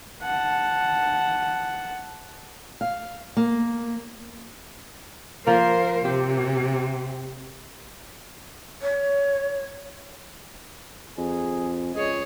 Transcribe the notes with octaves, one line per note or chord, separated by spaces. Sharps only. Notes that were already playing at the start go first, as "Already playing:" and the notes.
F#5 A5
F5
A#3
F3 A#3 A#4 C5
C3 G4
C#5
F2 G#4
C#2 G#4 C#5 D#5